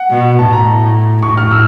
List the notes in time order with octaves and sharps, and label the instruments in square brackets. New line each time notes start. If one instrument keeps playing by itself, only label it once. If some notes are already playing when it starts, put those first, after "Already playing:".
Already playing: [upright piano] F#5
[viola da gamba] B2
[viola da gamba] A2 [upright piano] A5
[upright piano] A#5
[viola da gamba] A2 [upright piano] C#6
[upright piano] F6
E6